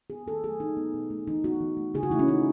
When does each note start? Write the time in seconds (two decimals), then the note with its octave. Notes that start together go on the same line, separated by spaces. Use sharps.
0.10 B3 G#4
0.26 D#3 A4
0.43 F#3 A3 G#4
0.60 E3 D#4
0.77 B3
0.94 B2
1.10 A3
1.27 E3 D#4
1.44 B3 F#4
1.60 E3
1.77 A3
1.94 C#3 G#4
2.03 F#4
2.10 E3 E4
2.14 A3
2.19 C#4
2.28 E3 D#4